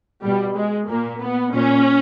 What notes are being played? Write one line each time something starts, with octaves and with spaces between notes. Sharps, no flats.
B2 G3
G#3
A#2 A#3
B3
A#2 C#4